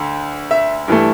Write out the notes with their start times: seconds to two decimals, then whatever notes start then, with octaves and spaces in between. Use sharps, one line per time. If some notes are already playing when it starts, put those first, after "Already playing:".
Already playing: D2 D3
0.51 E5
0.88 G2 E3 A3